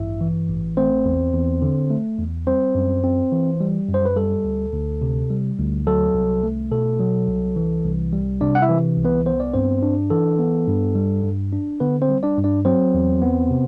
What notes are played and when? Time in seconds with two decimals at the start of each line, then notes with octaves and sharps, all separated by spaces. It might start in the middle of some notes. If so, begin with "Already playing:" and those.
Already playing: A1 G2 E4 E5
0.21 E3
0.49 A1
0.77 A3 C4 C5
1.05 E2
1.34 E2
1.62 D3
1.90 A3
2.18 E2
2.47 G3 C4 C5
2.75 F#2
3.04 C4
3.32 E3
3.61 G3
3.89 F#2
3.94 C5
4.05 B4
4.16 G3 A4
4.45 D2
4.73 D2
5.02 C3
5.30 G3
5.58 D2
5.87 F#3 A4
6.15 C2
6.43 A3
6.71 B2 A4
7.00 F#3
7.28 C2
7.56 E3
7.85 C2
8.13 G3
8.41 C3 D4 D5
8.55 F#5
8.62 E4 E5
8.69 E3
8.97 C2
9.04 B3 B4
9.26 B3 C5
9.40 D5
9.54 G2 C4 C5
9.83 D4
10.10 E3 A4
10.39 B3
10.67 G2
10.95 G3
11.24 G2
11.52 D4
11.80 D3 B3 B4
12.02 C4 C5
12.09 G3
12.23 D4 D5
12.37 G2
12.44 D4 D5
12.65 F#3 C4 C5
12.94 E2
13.22 B3
13.50 C3